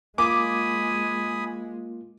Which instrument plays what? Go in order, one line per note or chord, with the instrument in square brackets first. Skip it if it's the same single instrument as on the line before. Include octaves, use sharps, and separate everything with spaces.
[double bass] G#3 [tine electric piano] A#3 F4 [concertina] G#5 B5 D#6 [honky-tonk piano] D6